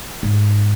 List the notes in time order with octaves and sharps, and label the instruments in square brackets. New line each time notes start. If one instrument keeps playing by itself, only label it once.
[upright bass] G#2